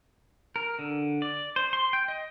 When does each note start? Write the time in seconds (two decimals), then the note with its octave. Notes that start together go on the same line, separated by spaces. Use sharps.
0.56 A#4
0.79 D3
1.22 D5
1.56 C5
1.73 C6
1.93 G5
2.08 D#5